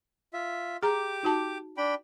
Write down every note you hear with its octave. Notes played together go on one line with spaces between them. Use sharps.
F4 E5
G4 G#4 A#5 D6
D#4 F#4 A5
D4 G5 B5